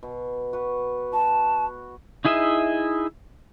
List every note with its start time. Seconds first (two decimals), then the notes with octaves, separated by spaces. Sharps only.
0.03 B2
0.53 F#4 B4
1.13 F#4 A5
2.25 D#4 E4 G#4 D#5 E5